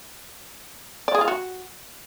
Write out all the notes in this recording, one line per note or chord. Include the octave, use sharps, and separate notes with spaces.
D5
G#4
F4
F#4